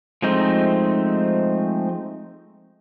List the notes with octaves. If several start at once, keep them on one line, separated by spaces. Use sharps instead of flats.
F3 G#3 A3 C4 D#4